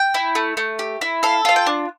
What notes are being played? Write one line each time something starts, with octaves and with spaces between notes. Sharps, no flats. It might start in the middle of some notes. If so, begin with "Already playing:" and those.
Already playing: G5
E4
A3
A3
G4
E4
A4 F5
F4 F5
G5
D4